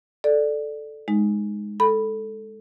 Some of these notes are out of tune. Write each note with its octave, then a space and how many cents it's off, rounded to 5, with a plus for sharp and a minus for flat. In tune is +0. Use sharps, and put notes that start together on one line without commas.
A4 -5 D5 +10
G#3 +0 D#4 +0
A4 +0 B5 -5